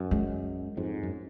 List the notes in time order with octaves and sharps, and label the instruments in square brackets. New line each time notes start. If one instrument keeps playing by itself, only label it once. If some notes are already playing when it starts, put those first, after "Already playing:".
Already playing: [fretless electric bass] F#2
[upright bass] G#3
[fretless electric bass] F2 G#2
F#2